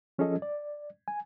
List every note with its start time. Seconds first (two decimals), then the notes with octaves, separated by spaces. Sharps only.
0.19 F3 C#4 F4 G#4 A4 D#5
0.42 D5
1.08 G#5